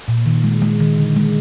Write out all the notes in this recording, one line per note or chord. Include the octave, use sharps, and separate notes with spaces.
A#2
D#3
G#3
G#3
D#3
D3
G#3